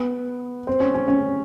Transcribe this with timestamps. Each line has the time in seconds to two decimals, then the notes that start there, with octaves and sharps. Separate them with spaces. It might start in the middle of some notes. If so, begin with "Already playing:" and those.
Already playing: B3
0.67 C4
0.80 C#4
0.94 C#4
1.08 C#4